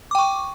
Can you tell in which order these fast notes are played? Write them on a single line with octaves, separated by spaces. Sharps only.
D6 G5 C#6